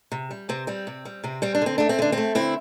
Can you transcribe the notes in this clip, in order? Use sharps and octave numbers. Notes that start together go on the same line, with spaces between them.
C3
G3
C3 C4
G3 C4
C3
G3
C3 C4
G3 C4
D4
D3 C4
A3 D4
C4
D3 D4
C4
A3
D3 C4 E4